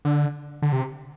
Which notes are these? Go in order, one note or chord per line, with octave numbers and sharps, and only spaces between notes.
D3
D3
C3